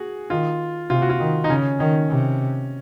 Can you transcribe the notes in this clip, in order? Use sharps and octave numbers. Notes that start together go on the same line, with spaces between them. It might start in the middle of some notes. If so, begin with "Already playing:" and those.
Already playing: F#4 G#4
D#3 F4
C3 F4
F#4
F4
D#3
D#4
C#3 C#4
D#3 C#4
C3